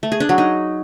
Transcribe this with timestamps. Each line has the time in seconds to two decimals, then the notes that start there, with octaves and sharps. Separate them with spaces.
0.03 A3
0.12 G#4
0.20 D4
0.29 F#3
0.38 D#4